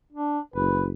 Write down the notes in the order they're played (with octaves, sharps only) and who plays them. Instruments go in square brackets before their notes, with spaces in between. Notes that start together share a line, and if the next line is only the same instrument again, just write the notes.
[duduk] D4
[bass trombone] F#1 [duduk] B4